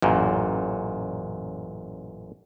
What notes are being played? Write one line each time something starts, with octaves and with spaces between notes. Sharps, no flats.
A1 F#2 A#2